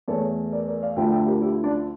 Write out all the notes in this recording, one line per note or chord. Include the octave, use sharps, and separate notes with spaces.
E2 E3 A3 A4 C#5
A#4 D5
A#4 D5
D5 F5
D2 D3 F3 A3 E5 G5
E5 G5
G4 A#4
E4 G4
D4